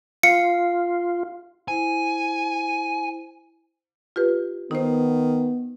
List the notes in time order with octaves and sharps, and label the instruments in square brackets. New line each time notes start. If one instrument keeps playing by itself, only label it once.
[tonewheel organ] F4 [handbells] F5 [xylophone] C#7
[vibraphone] E4 C5 [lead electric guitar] G#5
[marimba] F4 G4 B4
[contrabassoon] D#3 [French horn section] B3 [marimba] D#4 C5